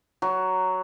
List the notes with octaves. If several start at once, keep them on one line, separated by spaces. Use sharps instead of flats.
F#3